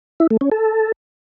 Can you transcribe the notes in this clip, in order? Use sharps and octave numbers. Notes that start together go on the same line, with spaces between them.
E4
A3
C#4
A4